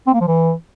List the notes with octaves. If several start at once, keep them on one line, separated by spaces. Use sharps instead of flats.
C4
A#3
F3
E3